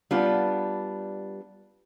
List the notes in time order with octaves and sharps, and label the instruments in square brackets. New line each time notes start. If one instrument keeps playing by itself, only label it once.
[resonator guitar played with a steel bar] G3 B3 D4 F4